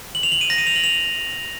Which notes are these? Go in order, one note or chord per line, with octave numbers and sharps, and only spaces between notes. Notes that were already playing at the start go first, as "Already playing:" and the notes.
F#7
F7
F#7
D#7
A#6
D#7
F7
F#7
F7